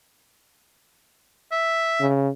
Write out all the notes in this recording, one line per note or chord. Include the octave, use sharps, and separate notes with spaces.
E5
C#3